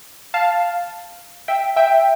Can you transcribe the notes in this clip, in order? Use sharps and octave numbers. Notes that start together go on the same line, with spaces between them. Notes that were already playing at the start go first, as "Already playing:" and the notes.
F5 A5
E5 G5
E5 G5